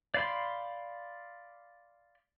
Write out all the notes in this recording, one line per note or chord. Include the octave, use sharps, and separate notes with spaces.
D5 F5 B5 C6